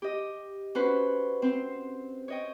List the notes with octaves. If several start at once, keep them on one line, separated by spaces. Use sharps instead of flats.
G4 D#5
C#4 F#4 B4 C5
C4 C5
C#5 D#5 G5